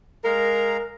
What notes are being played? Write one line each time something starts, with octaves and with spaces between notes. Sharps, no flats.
G#3 A#4 F5 A#5